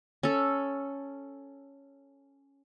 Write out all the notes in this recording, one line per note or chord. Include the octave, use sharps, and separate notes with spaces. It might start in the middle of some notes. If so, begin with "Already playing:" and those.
C#4 A4